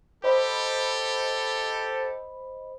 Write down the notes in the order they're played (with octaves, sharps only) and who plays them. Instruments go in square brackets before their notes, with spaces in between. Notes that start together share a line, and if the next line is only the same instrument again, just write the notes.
[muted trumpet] G4 [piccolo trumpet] A4 [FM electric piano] C5 D#5 B5